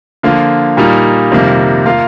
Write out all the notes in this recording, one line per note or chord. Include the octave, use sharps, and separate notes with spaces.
D3 F3 A#3 F4
A#2 G3 A#3 D#4
F2 C3 D#3 G3 A#3
A#3 F4 A#4 F5